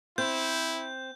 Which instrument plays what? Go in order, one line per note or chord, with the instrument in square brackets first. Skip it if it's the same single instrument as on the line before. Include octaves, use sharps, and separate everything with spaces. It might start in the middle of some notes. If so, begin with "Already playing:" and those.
[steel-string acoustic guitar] C4 [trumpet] E4 [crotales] G6